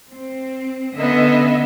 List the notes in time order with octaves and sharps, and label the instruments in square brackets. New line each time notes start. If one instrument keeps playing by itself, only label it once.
[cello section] C4
[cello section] D3 D#5 E5 [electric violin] B3 C#4